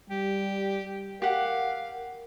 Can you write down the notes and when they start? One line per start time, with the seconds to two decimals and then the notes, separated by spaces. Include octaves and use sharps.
0.10 G3 G4
1.22 G4 A#4 F5 F#5